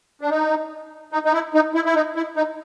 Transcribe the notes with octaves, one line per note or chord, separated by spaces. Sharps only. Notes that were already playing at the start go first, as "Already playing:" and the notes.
D4
D#4
D#4
D#4
E4
D#4
E4
E4
D#4
E4
D#4